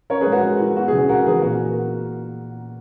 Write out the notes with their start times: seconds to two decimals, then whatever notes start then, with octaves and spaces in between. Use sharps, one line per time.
0.10 C#4 A#4 C#5
0.21 G#4 B4
0.26 G#3
0.32 F#4 A#4
0.43 G#3
0.60 E4
0.76 B3 F#4
0.88 G#4
0.93 C#3
0.98 G#4
1.09 C#2 F#4 A#4
1.26 E3 G#4 B4
1.42 A#2 F#4 A#4